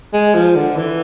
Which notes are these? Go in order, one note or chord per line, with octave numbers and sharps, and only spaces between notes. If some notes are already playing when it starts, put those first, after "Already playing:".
G#3
F3
D3
E3